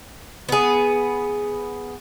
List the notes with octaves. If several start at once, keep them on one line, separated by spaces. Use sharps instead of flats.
B3 G#4